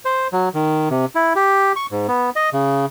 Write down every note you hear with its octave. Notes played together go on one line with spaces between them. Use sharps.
C5
F#3
D#3
C3
E4
G4
C#6
G#2
B3
D#5
C#3